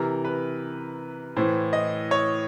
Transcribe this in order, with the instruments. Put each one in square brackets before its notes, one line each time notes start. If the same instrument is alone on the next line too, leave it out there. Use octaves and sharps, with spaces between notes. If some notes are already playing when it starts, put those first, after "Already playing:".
Already playing: [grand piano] C3 E3 A#4
B4
A2 E3 C5
D#5
C#5